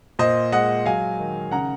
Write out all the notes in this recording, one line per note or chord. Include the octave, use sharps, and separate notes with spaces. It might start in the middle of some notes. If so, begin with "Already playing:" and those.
A#2 C5 D#5
G#3 D#5 F#5
F#3 F5 G#5
D#3
C#3 F#5 A#5